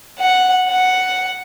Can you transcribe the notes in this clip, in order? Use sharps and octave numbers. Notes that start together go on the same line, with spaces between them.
F#5
F#5